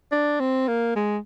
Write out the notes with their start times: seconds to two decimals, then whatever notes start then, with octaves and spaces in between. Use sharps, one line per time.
0.12 D4
0.40 C4
0.67 A#3
0.96 G#3